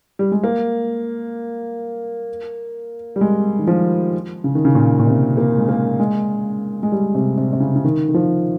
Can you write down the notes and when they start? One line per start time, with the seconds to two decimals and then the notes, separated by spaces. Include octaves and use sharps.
0.19 G3
0.32 G#3
0.43 A#3
3.16 G3
3.21 G#3
3.59 D#3
3.67 F3
4.44 C#3
4.55 D#3
4.65 C#3
4.75 A#2
4.99 A#2
5.07 C3
5.37 A#3
5.58 G#3
5.69 A#3
6.00 G#3
6.83 G#3
6.92 G3
7.15 C3
7.38 C3
7.53 C3
7.60 C#3
7.76 C#3
7.85 D#3
8.09 D#3
8.14 F3